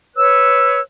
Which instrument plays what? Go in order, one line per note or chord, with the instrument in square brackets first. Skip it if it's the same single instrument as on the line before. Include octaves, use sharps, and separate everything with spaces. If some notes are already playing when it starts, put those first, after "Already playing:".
[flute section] B4 C#5 E6 F#6